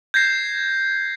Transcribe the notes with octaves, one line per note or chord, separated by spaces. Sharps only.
G6 G#6 A#6 C7